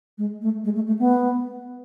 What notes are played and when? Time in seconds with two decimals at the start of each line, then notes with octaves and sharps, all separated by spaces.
0.18 G#3
0.42 A3
0.64 G#3
0.75 A3
0.87 A3
0.99 B3